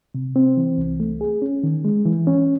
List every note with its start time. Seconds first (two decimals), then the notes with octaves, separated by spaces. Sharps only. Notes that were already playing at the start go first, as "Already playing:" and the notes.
0.15 C3
0.36 C4
0.57 E3
0.78 C2
1.00 A3
1.21 G#4
1.42 C#4
1.64 D#3
1.85 G#3
2.05 E3
2.27 C#4